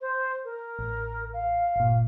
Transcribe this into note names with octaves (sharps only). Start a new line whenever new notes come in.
C5
A#4
A1
F5
G1 A#2